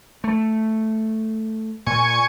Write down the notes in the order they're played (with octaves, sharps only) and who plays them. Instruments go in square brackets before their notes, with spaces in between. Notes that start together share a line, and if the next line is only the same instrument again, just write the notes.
[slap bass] A3
[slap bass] A#2 [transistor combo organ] G#5 C#6